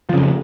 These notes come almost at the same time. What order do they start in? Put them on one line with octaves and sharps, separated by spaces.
F3 C#3 F2